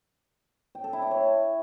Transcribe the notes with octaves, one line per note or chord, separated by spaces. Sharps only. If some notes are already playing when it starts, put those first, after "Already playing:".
G5
A4
E4
D5
C#5